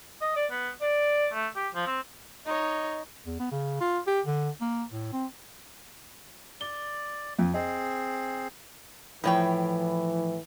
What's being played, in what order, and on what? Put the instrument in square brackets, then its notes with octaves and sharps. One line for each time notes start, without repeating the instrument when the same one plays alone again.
[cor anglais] D#5
D5
B3
D5
A3
G4
F3
C4
[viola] D#4 C#5 [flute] D#5
[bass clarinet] E2
B3
C#3
F4
G4
D3
A#3
A2
C4
[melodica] D5 [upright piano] G7
[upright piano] F2
[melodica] C4 G#4 [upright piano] D#5
[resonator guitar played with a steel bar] A2 C#5 G5 [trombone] E3 [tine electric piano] F3 B5